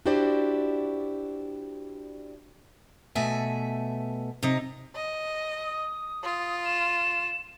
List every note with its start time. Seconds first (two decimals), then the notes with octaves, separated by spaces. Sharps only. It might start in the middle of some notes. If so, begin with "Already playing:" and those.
0.06 D4 E4 F#4 G4 C5 D5
3.15 B2 A3 E5 G#5
4.43 C3 D#4
4.95 D#5
5.64 D#6
6.24 F4
6.65 E7